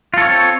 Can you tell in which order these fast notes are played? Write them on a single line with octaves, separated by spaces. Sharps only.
F4 A4 C#5 C4